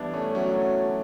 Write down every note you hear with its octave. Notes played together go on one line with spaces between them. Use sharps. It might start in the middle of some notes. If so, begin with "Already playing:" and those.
Already playing: E3 G3 B3 D4 E4
A3 C#4
F#3 A3 C#4